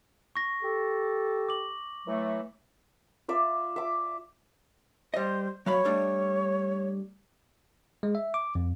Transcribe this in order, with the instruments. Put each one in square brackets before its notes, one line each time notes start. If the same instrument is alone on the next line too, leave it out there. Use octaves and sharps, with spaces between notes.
[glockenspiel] C#6 A#6
[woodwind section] G4 A4
[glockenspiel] D6 F#7
[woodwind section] E3 F#3 A3
[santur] F4 D5 E5
E5 D6
[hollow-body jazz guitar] G3 D#5 [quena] C5
[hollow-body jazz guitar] F#3 F5 B5 [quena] C#5
[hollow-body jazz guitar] G3 A3 D4
[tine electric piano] G#3
E5
D6
F2